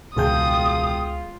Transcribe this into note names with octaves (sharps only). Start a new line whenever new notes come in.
E1 C#2 F4 G#4 G5 A5 D#6 G6